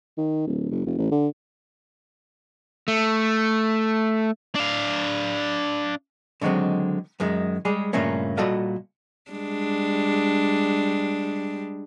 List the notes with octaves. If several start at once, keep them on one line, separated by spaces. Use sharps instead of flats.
D#3
D1
F#1
F1
A1
D3
A3
D4 F5
D3 D#3 F#3 G#3 C4
F#2 D#3 G#3
G3 G#3 G#4
G2 A#2 C#3 A3 A#3 C#4
A#2 G3 F#4 A4 D#5 F5
G3 G#3 D4